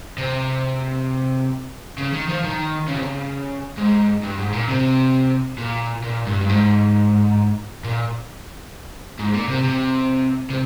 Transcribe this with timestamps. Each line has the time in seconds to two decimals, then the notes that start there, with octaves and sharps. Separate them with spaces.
0.18 C3
1.98 C#3
2.13 D#3
2.29 F3
2.44 D#3
2.88 C#3
2.95 C3
3.03 C#3
3.78 G#2
4.23 G2
4.39 G#2
4.53 A#2
4.68 C3
5.58 A#2
6.04 A#2
6.27 G2
6.41 G2
6.49 G#2
7.84 A#2
9.19 G#2
9.34 A#2
9.49 C3
9.64 C3
10.50 C3